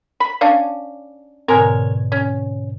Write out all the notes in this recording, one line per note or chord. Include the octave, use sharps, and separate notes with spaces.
B5
C#4 D4 F5
G#2 B2 D3 C4 A#4 C#5 G#5
C#4